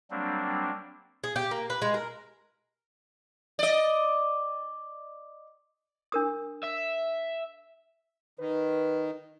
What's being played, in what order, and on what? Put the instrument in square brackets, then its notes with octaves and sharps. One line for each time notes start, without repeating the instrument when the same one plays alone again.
[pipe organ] F#3 G3 A#3 C4 D4
[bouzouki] G#4
G4
A#3
B4
G#3
A#4
[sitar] D5 D#5
[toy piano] D4 A#4 D#6
[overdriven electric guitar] E5
[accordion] D#3 [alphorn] B4